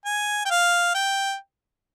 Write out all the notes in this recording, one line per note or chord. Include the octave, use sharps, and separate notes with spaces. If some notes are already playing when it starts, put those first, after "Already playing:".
G#5
G5
F5
G5